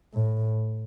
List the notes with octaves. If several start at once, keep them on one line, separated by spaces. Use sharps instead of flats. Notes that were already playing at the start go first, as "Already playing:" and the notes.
A2